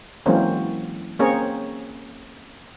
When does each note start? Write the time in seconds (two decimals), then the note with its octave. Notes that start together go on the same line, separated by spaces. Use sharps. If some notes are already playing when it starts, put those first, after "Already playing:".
0.26 E3 F#3 G#3 A#3 C4 C#4
1.19 A#3 C4 C#4 G#4 A#4 C#5